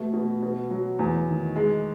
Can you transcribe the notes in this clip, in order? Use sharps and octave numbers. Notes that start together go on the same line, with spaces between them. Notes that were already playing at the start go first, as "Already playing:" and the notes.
Already playing: B2 A3
B2
B2
F#3
E2
D#3
G#3